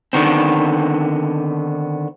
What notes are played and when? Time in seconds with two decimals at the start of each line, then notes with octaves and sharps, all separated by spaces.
0.13 D3 D#3 B3 C4